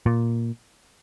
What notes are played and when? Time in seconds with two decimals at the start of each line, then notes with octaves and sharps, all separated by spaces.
0.06 A#2